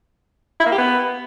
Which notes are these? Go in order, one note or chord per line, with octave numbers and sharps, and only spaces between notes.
E4
A#3
G4
B3